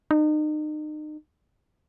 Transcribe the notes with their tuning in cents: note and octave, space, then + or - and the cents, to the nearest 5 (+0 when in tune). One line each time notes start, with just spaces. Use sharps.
D#4 -35